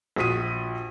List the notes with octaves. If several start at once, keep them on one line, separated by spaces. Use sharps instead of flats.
A#1 F#4 D#6 B6 D#7